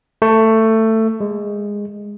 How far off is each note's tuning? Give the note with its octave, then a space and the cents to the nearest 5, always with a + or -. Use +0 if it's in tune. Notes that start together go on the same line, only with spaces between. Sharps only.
A3 +15
G#3 -15